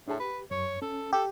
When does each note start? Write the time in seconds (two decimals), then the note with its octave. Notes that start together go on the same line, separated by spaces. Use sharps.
0.07 A2 D4 G#4 A5
0.20 G4 B4
0.51 F#2 C#5 C#6
0.82 C#4 A4
1.13 G4 A4